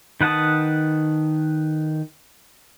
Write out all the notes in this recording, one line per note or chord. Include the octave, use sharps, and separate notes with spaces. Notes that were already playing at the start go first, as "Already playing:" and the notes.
D#3 B4 F#5 A5 D#6